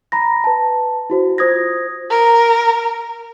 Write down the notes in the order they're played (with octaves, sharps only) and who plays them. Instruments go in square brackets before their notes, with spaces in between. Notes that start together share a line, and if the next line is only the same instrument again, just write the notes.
[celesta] A#5 B5 A#6
B4 A5
E4 F#4 C5
F4 C5 D#6 G#6 A#6
[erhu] A#4